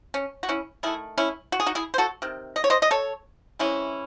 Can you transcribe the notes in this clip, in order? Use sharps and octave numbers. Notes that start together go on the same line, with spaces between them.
C#4
F#4
C#4 E4
D#3 A3 E4 G#4
C#4 E4
F#4
G#4
D#4 F#4
E4 G#4
C5
F#4 A4
C3 D#3
D#5
C#5
C5 D#5
D#5
A4 C#5
C3 E3 G#3 C#4 E4